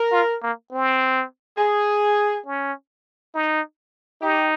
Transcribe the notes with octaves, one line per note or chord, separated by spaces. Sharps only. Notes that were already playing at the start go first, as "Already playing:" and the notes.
Already playing: A#4
F4
A#3
C4
G#4
C#4
D#4
D#4 G4